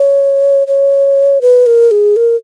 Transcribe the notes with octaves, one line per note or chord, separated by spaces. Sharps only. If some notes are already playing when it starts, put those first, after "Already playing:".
Already playing: C#5
C#5
B4
A#4
G#4
A#4